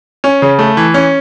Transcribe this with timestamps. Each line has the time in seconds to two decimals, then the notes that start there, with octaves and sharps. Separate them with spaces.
0.24 C#4
0.42 C#3
0.59 A3
0.77 E3
0.94 C#4